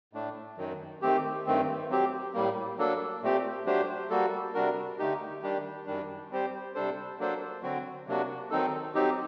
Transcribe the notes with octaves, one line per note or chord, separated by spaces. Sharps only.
A2 A3 D4
F#2 D#3 F#3
D#3 A3 C4 G4
G2 D#3 A3 C4
F#3 C4 G4
A2 G3 A#3
F#3 A#3 D4 A4
A#2 A3 C4 G4
F#3 A3 D4 G4 C5
G3 A#3 F#4 A4
C3 G3 D4 F#4 A#4
D3 A3 D#4 G4
D#3 G3 D4 G4
F#2 D#3 G3 D4
G3 C4 G4 C5
C3 G3 D4 A4 C5
F#3 A#3 D4 A4 C5
D3 F#3 C4 F#4
C3 F#3 A#3 D4 F#4
D#3 F#3 C4 D#4 A4
F#3 C4 D#4 G4